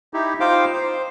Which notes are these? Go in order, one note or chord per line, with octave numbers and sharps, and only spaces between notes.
D#4 E4 G4
D#4 F4 C5 F5 G5 D6
C5